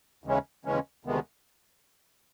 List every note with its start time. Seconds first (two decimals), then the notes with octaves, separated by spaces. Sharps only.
0.24 D#2 C#3 E3 G#3 C#4
0.65 D#2 C#3 E3 G#3 C#4
1.05 D2 C3 D#3 G#3 B3